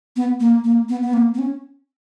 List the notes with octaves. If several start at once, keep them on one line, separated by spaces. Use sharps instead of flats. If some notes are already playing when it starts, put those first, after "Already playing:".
B3
A#3
A#3
B3
B3
A#3
B3
C#4